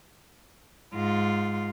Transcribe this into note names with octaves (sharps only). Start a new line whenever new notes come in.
G#2 F4